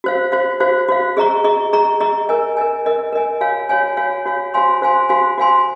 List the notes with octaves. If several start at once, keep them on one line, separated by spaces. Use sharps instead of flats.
F#4 C5 F5
F#4 C5 F5
F#4 C5 F5
F#4 C5 F5
G#4 D#5 A#5 C#6
G#4 D#5 A#5 C#6
G#4 D#5 A#5 C#6
G#4 D#5 A#5 C#6
A#4 D#5 G#5
A#4 D#5 G#5
A#4 D#5 G#5
A#4 D#5 G#5
F#4 C#5 F5 G#5
F#4 C#5 F5 G#5
F#4 C#5 F5 G#5
F#4 C#5 F5 G#5
F#4 C5 F5 G#5 C6
F#4 C5 F5 G#5 C6
F#4 C5 F5 G#5 C6
F#4 C5 F5 G#5 C6